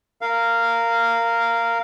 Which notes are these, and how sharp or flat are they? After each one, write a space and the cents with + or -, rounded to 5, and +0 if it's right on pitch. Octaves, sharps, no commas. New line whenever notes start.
A#4 -10 F5 -10